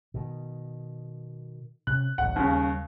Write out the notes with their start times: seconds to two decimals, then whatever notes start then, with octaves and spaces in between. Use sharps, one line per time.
0.14 B2 D#3
1.87 C3 C#4 F#6
2.18 D1 A1 F#5
2.36 D#2 C#3 G3